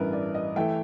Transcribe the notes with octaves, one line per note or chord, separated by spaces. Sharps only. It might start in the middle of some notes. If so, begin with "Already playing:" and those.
Already playing: A1 G2 E3 A#4 B4
D5
D#5
E3 A3 G5